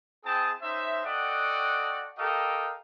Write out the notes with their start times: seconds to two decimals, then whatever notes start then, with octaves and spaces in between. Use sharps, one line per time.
0.25 C4 E4 G#4 G5 A5 D#6
0.62 C#4 D#4 C5 E5
1.05 F#4 A4 D5 D#5 F#5 G5
2.18 G4 A4 A#4 D#5 F5 G5